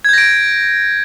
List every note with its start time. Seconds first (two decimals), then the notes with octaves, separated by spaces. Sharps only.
0.05 G#6
0.09 G6
0.13 A#6
0.18 D7